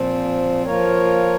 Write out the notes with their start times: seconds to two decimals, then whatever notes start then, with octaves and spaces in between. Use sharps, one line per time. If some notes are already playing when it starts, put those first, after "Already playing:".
Already playing: A#2 F3 C4
0.65 F3 A#3 F4 A#4 C#5